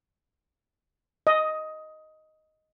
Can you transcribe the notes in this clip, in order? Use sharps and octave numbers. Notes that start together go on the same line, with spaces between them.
D#5